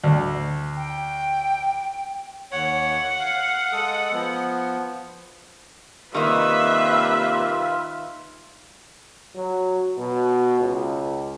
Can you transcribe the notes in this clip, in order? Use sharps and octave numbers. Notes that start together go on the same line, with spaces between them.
D2
G5
D#2 C#5 F#5
F5
G#3 A4 D#6
F3 B3
C3 D#3 G3 A#3 D#4 F4 B4 E5
F#3
B2
C#2